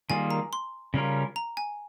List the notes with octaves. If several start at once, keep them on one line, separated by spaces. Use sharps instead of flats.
D#3 G3 A#3 F4 G#4 G#5
A#5
C6
C#3 G3 C#4 F4 A#4
A#5
G#5